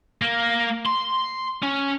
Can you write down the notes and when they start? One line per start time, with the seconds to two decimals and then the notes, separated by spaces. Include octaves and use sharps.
0.22 A#3
0.85 C6
1.63 C#4